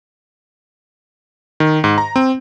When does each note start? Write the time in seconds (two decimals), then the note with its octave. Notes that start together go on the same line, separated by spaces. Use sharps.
1.60 D#3
1.84 G#2
1.98 A#5
2.16 C4